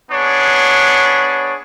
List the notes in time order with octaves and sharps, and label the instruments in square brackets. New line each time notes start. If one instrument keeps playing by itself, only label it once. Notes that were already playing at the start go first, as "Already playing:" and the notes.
[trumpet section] B3 D4 G#4 C#5